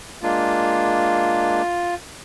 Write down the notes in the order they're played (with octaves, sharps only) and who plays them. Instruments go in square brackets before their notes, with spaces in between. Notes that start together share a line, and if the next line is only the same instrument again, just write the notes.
[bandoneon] G#3 A#3 D4 [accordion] F4